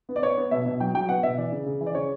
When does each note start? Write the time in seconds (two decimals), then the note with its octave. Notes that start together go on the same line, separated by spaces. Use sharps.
0.09 B3
0.16 D5
0.22 B3 C#5
0.37 B3
0.51 B2 E5
0.66 B2
0.80 F#3 G5
0.94 F#3 G5
1.09 B3 F#5
1.23 B2 E5
1.38 E3 D5
1.52 C#3
1.66 C#3
1.81 E3
1.87 D5
1.95 C#3 C#5